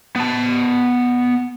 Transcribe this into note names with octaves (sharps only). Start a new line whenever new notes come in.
B3 A5